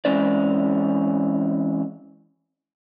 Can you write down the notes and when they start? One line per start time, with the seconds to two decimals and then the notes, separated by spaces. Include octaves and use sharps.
0.05 E3 G#3 C4 C#4 D5